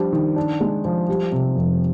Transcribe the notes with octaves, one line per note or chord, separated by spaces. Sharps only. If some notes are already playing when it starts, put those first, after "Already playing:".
Already playing: F3 G3 D4
D#3
D4
G#3
F3
G3
C3
F2